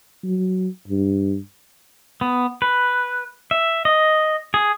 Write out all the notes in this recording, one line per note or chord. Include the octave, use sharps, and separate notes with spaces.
F#3
G2
B3
B4
E5
D#5
G#4